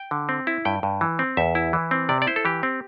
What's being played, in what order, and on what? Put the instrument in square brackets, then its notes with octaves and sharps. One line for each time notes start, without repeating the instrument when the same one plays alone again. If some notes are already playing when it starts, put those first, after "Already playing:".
Already playing: [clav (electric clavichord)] G5
D3
C4
E4
G2 G5
G2
E3
C4
E2 E5
E4
E3
C4
C3 D5
D5
E4 C5
A4
E3 G4
C4